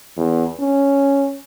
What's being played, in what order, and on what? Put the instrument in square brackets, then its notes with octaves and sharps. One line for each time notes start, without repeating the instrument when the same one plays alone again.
[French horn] E2
C#4